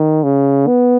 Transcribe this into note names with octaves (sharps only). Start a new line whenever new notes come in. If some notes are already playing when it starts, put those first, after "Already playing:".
Already playing: D#3
C#3
B3